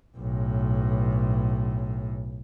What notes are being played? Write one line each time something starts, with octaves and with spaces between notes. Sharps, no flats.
B1 A2